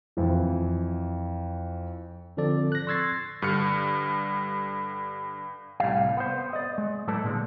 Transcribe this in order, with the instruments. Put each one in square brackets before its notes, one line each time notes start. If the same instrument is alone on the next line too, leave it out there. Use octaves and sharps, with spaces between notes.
[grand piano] F2 E3
[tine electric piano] D3 F3 C4 A4 D5
F#6 A#6
C6 C#6 E6 G#6 A6 C7
[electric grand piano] G2 D3 F6 C#7
[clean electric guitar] C2 A2 G3 F5
B3 C5
D5 D#5
G#3
A2 F#3 A4 B4 D5 A5
A#2 D3 G#3